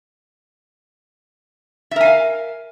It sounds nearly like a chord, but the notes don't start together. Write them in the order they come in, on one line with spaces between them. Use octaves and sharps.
E5 A#4 G#5 F5